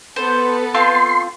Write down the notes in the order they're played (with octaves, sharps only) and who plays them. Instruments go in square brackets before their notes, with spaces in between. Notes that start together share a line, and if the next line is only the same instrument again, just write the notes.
[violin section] B3 A4 [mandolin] C5
[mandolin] C4 F4 A5 [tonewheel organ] C6